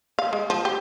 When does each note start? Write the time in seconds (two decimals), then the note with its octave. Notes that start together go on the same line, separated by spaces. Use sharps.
0.19 F5
0.33 G#3
0.50 F3
0.65 G4